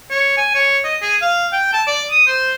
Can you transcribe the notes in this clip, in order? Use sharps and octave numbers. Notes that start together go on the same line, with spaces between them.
C#5
G#5
C#5
D#5
G#4
F5
G5
A5
D5
D#6
C5